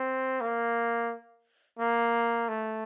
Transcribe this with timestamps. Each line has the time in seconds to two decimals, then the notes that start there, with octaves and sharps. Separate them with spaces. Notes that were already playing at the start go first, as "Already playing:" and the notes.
Already playing: C4
0.41 A#3
1.79 A#3
2.48 A3